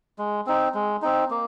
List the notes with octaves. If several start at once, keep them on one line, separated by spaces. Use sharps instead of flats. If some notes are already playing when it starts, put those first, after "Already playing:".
G#3
C4 D#4
G#3
C4 D#4
A#3